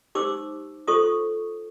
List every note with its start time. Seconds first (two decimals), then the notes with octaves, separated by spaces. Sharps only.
0.15 D#4 G4 C5 D6 E6
0.87 F4 A4 C5 C#6 D#6